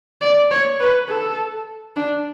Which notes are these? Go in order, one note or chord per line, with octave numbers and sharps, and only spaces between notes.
D5
C#5
B4
A4
D4